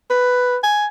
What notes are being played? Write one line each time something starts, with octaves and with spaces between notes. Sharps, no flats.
B4
G#5